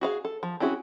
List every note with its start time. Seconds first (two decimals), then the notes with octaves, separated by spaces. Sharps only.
0.01 F#4 G#4 F5
0.25 A4
0.43 F3
0.60 C4 C#4 E4 F#4 G#4